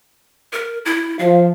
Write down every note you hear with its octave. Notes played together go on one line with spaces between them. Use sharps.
A#4
E4
F3 F5